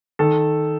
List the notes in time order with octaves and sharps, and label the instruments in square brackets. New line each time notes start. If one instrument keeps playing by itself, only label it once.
[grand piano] D#3 A4